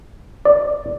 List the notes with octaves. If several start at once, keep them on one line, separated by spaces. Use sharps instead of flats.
D5